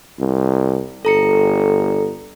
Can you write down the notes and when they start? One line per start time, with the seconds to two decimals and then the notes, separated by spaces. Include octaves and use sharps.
0.19 C2
1.05 G1 A4 A#5 C#7